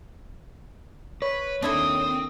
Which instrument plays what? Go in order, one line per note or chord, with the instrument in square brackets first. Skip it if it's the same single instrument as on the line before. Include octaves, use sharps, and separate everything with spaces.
[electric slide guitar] B4 [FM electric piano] C#5
[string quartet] D#2 D#6 [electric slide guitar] C4 [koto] D4 E4 A4